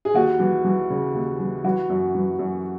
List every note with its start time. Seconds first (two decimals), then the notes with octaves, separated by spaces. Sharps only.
0.05 G#4
0.14 D#2 F#4
0.40 E3
0.65 E3
0.90 C#3
1.15 D#2
1.39 E3
1.64 E3 F#4
1.89 F#2
2.15 E3
2.39 F#2